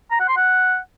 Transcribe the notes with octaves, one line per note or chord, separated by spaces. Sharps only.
A#5
F#5
C6
F#5